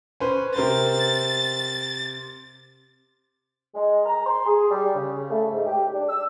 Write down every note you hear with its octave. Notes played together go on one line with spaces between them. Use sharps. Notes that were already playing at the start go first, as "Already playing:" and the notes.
C#4 B4 C5
C3 A#4 C5 A6
G#3
A#5
C6
G#4
G3
C#3
A3
G#2
G4
D4
E6